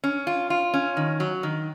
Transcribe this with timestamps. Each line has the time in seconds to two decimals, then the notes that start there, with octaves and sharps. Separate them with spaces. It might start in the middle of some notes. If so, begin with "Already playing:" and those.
0.04 C#4
0.27 F4
0.50 F4
0.74 C#4
0.97 D#3
1.20 F#3
1.43 D#3